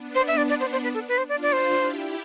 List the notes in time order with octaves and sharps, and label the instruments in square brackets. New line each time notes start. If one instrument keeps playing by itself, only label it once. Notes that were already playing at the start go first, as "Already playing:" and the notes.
Already playing: [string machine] B3 D4
[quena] C5
E5
D5
D5
C5
C5
B4
A4
B4
C5
[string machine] D4 F4 [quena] D5
[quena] D5
C5
[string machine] E4 G4